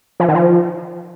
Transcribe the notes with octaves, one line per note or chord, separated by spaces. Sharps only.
F3
D#3
F3